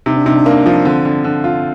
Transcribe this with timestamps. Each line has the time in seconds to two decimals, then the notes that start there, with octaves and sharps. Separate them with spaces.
0.06 C3 D#4
0.16 D4
0.26 C3 D#4
0.35 D4
0.46 A#3 D4
0.66 F3
0.85 D3 C4
1.05 D3
1.24 D3
1.44 F4